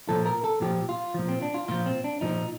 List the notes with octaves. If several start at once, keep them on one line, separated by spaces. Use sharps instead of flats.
A#2 F3 A4
A#4
A4
A#2 F3 G4
F4
A#2 F3
C4
D4
F4
A#2 F3 F4
C4
D4
A#2 F3 D#4